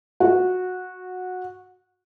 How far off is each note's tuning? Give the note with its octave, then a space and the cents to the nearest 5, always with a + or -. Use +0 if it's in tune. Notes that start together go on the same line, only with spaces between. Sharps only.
F#4 -15